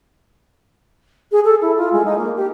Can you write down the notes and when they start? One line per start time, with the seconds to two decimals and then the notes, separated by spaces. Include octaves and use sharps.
1.31 G#4
1.44 A4
1.61 E4
1.76 F4
1.92 G#3
2.04 D#4
2.17 A#3
2.36 G4